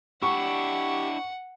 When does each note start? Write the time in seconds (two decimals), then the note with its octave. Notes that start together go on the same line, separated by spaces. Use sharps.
0.22 D4 E4 G4 F#5 C#6